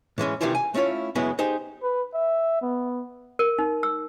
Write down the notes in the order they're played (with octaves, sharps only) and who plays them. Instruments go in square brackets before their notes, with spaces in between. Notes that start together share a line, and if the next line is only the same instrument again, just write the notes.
[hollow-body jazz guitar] A2 E3 G#3 C#4
C3 D#3 E3 G3 E4 F4
G#5
A3 C#4 E4 F4 C#5
F#2 C#3 G#3 B3 E4
D#4 G4 G#4 C5
[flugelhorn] B4
E5
B3
[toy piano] A#4
D#4
E6